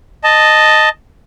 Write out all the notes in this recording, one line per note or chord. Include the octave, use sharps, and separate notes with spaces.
D#5 A5